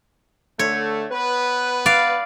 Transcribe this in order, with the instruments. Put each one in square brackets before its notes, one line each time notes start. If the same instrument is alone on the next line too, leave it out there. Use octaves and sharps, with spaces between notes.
[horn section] D3 A3 [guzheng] C#5
[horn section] B3 B4
[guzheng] D5 F5